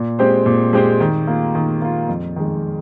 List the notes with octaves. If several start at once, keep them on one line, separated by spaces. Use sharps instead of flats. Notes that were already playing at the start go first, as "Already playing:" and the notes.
Already playing: A#2
G#3 C4 G4 C5
A#2
G#3 C4 G4 C5
D#3
A#3 F4
D#3
A#3 F4
F2
D#3 G#3